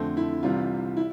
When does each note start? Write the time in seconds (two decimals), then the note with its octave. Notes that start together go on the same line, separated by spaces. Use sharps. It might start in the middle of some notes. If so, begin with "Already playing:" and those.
Already playing: F2 D3 A3 C4
0.17 E4
0.43 C2 C3 E3 G3 F4
0.97 E4